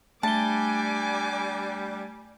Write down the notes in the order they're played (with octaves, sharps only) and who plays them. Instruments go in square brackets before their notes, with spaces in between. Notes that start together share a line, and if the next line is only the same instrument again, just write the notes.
[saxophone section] G3 D4 [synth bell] A3 G7 [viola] G#5 D6 [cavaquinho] A5